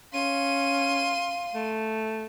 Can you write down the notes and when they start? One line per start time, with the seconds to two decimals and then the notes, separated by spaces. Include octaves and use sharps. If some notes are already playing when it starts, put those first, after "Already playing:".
0.14 C#4 F5 C6 D#7
1.55 A3